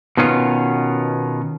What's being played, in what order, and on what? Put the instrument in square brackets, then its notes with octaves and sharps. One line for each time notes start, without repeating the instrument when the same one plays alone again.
[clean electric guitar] B2 D#3 B3 C#4 F4